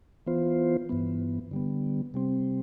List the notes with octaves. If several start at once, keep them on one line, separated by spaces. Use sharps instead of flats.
E3 B3 F4 C5
G2 E3 B3
D3 G3 B3
C3 G3 C4